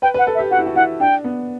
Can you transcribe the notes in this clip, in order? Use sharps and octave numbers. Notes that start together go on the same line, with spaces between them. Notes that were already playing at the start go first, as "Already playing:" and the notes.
B4 G5
B4
F#5
A4
E5
G4
F#4 F#5
E4
F#4
E4 F#5
D4 G5
B3